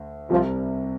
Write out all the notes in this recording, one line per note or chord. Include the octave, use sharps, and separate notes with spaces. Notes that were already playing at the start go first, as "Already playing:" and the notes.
Already playing: D2
C2 C3 F3 G3